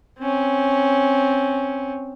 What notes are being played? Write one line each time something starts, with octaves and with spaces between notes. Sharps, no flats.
C4 C#4